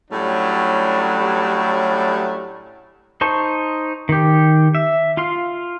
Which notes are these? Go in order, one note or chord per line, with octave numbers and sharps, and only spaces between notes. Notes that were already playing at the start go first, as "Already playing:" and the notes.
A2 F#3 G3 A3 C#4 D4
D#4 C5 A5 C#6
D#3 G4
E5
F4 F5 C6